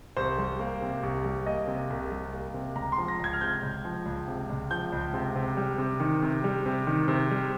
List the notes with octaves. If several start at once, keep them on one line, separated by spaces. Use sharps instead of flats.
C2 C5
G3
A#3
C3
C2
G3
A#3 D#5
C3
C2
G3
A#3
C3
C#2 A#5
C6
F3
A#6
C#2 G#6
F6
C3 G6
C#2
F3
C#2
C3
C#2
F3 G6
C#2
C3
C3
G3
C3
D#3
C3
G3
C3
D#3
C3
G3